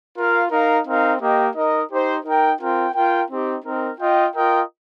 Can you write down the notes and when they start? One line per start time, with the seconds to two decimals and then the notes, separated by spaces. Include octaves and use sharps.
0.17 F4 A#4 F5
0.51 D#4 A#4 F5
0.86 C4 D#4 A#4 F5
1.20 A#3 G4 D#5 G5
1.55 D#4 A#4 D#5
1.90 D#4 G4 C5
2.25 D#4 A#4 G5
2.60 C4 F4 A#4 G5
2.95 F4 A#4 G5
3.29 C4 D#4 G4
3.64 C4 D#4 A#4
3.99 F4 D#5 G5
4.35 F4 A#4 D#5 G5